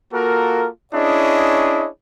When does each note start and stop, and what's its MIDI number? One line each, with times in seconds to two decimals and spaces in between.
0.12 0.68 58
0.12 0.68 65
0.12 0.68 66
0.12 0.68 69
0.12 0.68 70
0.93 1.88 61
0.93 1.88 62
0.93 1.88 64
0.93 1.88 68
0.93 1.88 73
0.93 1.88 75